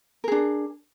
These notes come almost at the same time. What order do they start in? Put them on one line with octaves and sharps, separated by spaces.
A#4 G#4 D4